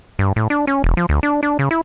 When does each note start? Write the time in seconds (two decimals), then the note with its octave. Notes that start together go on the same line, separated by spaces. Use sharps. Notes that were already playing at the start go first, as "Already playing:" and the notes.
0.19 G2
0.36 A2
0.50 D4
0.67 C#4
0.84 E1
0.97 F3
1.09 D2
1.23 D4
1.43 D4
1.59 C#3
1.71 E4